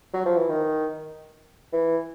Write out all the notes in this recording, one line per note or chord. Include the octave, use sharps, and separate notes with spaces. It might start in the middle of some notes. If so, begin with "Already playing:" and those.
F#3
F3
E3
D#3
E3